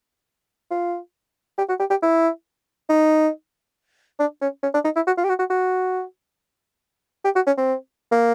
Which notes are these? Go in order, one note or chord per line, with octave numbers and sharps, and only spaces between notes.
F4
G4
F#4
G4
G4
E4
D#4
D4
C#4
C#4
D4
D#4
E4
F#4
F4
G4
F#4
F#4
F#4
G4
F#4
C#4
C4
A#3